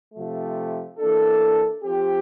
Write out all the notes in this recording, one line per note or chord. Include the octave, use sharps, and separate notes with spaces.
C3 F3 A3
E3 A#3 D4 A4
F3 C4 G4